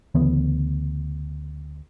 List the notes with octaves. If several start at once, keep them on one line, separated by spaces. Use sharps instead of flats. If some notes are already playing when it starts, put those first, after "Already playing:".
D2 C#3 E3 B3